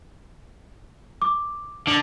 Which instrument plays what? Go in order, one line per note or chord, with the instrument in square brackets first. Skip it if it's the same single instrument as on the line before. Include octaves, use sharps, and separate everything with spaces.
[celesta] D6
[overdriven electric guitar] D3